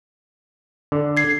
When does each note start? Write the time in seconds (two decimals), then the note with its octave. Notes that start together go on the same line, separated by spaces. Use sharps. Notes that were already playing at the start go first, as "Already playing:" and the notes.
0.92 D3
1.17 G#6 C7